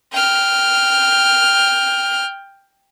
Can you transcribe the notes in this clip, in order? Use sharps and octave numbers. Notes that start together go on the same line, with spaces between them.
G5 F6